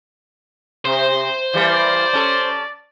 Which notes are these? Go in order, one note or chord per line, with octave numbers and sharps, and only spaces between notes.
C3 C5
E3 G3 A#3 D5
C#4 A4